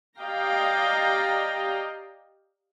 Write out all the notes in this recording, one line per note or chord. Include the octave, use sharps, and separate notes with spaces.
G4 D5 D#5 F5 G5 A#5